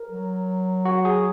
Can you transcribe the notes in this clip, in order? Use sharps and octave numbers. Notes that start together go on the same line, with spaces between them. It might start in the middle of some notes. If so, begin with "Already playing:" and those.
Already playing: A#4
F#3
F#4
G#4